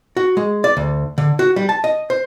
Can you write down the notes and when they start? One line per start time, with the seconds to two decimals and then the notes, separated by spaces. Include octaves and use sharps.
0.17 F#4
0.37 G#3
0.64 D5
0.77 D2
1.18 D3
1.39 F#4
1.56 G3
1.69 A5
1.84 D#5
2.10 C5